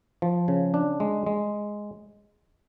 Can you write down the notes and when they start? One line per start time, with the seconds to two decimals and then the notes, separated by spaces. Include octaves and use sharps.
0.22 F3
0.48 C#3
0.74 D4
1.00 G#3
1.26 G#3